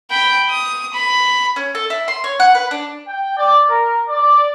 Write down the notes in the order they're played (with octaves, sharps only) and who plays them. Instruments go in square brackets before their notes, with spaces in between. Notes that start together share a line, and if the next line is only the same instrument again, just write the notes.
[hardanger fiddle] G5 B5
D#6
B5
[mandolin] C#4
A4
E4
C6
C#5
F#5
B4
D4
[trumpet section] G5
D5
A#4
D5